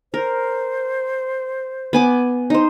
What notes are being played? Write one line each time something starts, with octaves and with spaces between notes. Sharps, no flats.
A#4 C5
B3 G#5 D6
D#4 C5